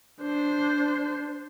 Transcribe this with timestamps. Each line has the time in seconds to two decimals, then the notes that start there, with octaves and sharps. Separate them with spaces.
0.22 D4 C5